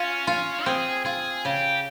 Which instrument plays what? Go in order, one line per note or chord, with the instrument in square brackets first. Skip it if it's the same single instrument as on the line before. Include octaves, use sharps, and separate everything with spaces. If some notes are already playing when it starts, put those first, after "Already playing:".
Already playing: [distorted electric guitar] C#4 [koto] F4
[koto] F4
[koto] C4 [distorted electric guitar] G#4
[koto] F4 [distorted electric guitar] G#4
[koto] C#3 [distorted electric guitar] G4